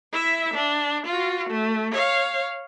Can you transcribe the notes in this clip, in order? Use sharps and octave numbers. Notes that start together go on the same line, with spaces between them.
E4 E5
D4
F4 F#4
A3
C#5 F5